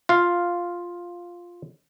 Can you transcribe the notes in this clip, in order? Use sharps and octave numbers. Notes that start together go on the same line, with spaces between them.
F4 F5